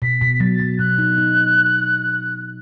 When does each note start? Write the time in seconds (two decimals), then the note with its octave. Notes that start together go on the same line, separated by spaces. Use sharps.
0.02 B2 B6
0.21 B2
0.40 F#3 A6
0.60 F#3
0.79 B2 F#6
0.99 D#4
1.18 D#4